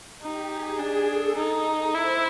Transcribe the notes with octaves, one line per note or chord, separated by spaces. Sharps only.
D#4 G4
G#4
D4
A4
D#4
E4 C5